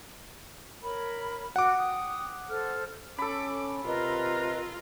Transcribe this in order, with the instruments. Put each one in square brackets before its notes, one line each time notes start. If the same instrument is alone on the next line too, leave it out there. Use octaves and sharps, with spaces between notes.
[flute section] A#4 C#5 B5
[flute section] F#4 [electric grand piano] F#5 D6
[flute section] G5 D#6
A4 C5 F6
[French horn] C#4 [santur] A4 B5 [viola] D6
[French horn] C3 [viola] F4 [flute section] A#4 B4 D#5